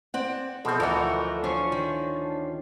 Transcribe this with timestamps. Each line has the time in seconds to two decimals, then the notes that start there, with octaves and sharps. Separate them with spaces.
0.14 C4 D5 F#5
0.65 B2 F3 G#3 A3 C4 A4
0.80 D2 E3 F3 A3 D4 D#4 F#4 A#4
1.44 C#4 D4 F4 C5 C#6
1.72 D#3